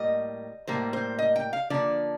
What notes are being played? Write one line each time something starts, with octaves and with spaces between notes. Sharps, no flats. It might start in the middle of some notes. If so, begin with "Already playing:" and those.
Already playing: A2 G3 A#3 D#5
A2 G3 A#3 C5
C5
D#5
G5
F5
D3 F3 A#3 D5